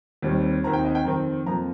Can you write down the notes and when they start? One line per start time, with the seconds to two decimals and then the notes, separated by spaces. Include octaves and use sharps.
0.22 D#2 D#3 G3 C4
0.64 D#2 D#3 C4 A#5
0.73 G5
0.85 D#5
0.95 G5
1.05 F2 D#3 C4 A#5
1.46 F2 F3 A#3 A#5